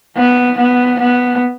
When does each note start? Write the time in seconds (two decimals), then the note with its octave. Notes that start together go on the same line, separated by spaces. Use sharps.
0.16 B3
0.58 B3
1.00 B3